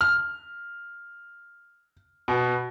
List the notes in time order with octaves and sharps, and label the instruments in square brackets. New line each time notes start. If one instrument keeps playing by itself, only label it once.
[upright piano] F6
B2